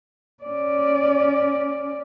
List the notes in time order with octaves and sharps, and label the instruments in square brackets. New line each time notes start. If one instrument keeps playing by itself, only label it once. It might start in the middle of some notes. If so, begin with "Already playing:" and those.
[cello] C#4 D5